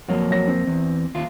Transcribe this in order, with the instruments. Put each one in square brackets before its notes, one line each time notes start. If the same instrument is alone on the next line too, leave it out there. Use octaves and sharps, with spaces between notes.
[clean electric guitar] F2 A#3 [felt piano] F#3
[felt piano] F#3 A#6
C4
[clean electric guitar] E2
D#2 F4